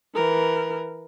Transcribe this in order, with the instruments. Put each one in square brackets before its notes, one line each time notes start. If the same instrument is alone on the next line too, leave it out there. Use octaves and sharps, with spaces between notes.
[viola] E3 A#4